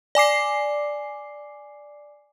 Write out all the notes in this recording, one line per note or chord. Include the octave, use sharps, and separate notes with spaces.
D5 G#5 D6 C7